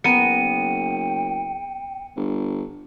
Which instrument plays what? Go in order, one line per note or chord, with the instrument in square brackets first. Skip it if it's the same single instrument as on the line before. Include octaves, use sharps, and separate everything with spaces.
[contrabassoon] F#1 [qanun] B3 A#4 [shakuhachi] G5 [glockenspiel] C#7 D#7
[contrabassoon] G1